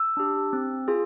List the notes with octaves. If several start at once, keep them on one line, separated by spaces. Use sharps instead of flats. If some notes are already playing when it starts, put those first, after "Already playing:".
Already playing: E6
D4 G4
C4
F4 G#4